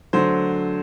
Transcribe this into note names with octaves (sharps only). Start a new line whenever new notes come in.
D3 F#3 A3 C5